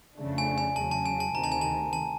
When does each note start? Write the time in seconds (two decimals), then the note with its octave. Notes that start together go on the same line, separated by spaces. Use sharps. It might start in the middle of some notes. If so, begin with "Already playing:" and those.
0.18 F2 C#3 F3 A3 D4
0.38 G#5
0.58 G#5
0.76 E2 C#3 F#3 A5
0.91 A5
1.06 G#5
1.20 A5
1.35 D2 C3 D#3 A#5
1.44 A5
1.52 G#5
1.61 A5
1.93 A5